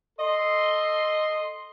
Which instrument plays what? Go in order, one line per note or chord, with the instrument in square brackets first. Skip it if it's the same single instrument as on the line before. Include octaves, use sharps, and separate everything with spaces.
[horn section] A4 D#5 C6